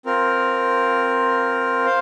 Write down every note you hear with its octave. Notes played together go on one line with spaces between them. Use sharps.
C4 F4 A#4
C5 F5